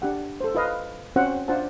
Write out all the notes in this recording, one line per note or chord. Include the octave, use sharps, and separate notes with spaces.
D4 G4 F#5
A4 C5
F4 B4 D#5 F5
C4 C#4 F4 F#4 C5 F#5
D4 F4 C5 F#5 A5